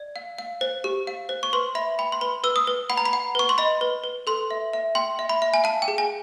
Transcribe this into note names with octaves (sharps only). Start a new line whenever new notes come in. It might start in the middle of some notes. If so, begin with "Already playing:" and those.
Already playing: D5
F5
F5
C5
G4
F5
C5
C#6
B4 C6
E5 B5
G5 B5
C6
B4 B5
B4 E6
D#6
B4
F#5 B5
A#5
B5
F#5
B4 C#6
C6
D#5 B5
B4
B4
A4 C6
E5
E5
G5 C6
E5
B5
E5
G#5
F5 A5
G5
G#4
G#5